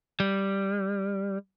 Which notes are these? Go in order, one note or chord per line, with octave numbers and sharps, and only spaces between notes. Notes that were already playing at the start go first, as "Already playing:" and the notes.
G3